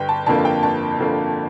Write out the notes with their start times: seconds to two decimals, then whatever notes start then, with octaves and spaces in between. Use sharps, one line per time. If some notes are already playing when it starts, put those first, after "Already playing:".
Already playing: G1 G5
0.09 A5
0.26 F2 D3 F3 A#3 A5
0.45 G5
0.63 G1 A5
0.99 F2 D3 F3 A#3